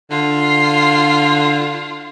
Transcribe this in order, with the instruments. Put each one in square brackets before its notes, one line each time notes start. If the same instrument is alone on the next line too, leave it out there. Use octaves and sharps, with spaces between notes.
[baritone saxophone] D3 [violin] F4